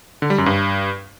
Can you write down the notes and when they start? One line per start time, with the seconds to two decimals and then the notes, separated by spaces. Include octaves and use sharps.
0.22 D3
0.30 G3
0.38 F#2
0.46 G2